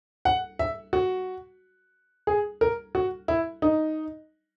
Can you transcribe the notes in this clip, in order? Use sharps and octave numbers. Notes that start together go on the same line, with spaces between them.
F#5
E5
F#4
G#4
A#4
F#4
E4
D#4